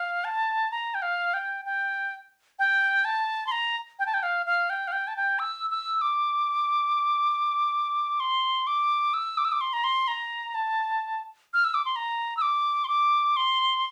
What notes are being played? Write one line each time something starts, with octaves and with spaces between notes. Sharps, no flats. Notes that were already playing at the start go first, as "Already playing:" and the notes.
Already playing: F5
A5
A#5
G5
F5
G5
G5
G5
A5
C6
A#5
G5
A5
G5
F5
F5
G5
F5
G5
A5
G5
E6
E6
D6
C6
D6
E6
D6
E6
D6
C6
A#5
C6
A#5
A5
F6
E6
D6
C6
A#5
E6
D6
C6
D6
C6